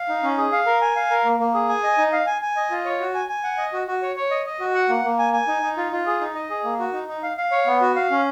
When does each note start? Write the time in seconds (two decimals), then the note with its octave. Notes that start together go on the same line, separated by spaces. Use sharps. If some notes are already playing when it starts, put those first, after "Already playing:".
Already playing: F5
0.09 D#4
0.23 C#4
0.38 G#4
0.52 F5
0.66 A#4
0.81 G#5
0.96 F5
1.10 A#4
1.24 A#3
1.40 A#3
1.54 G#4
1.69 G#5
1.84 D#5
1.98 D#4
2.12 F5
2.27 G#5
2.42 G#5
2.56 D#5
2.71 F4
2.85 C#5
3.00 F#4
3.15 G#5
3.29 G#5
3.43 F#5
3.58 D#5
3.73 F#4
3.87 F#4
4.02 C#5
4.16 C#5
4.31 D#5
4.46 D#5
4.60 F#4
4.75 F#5
4.89 A#3
5.04 A#3
5.19 G#5
5.33 G#5
5.48 D#4
5.62 D#4
5.77 F4
5.92 F4
6.06 G#4
6.21 D#4
6.35 D#5
6.50 G#4
6.64 A#3
6.79 F#4
6.93 D#4
7.08 D#4
7.23 F5
7.37 F5
7.51 C#5
7.66 B3
7.81 F#4
7.96 F5
8.10 C#4